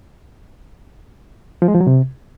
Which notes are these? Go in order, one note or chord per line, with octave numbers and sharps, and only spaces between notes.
F3
G#3
F3
F#3
C3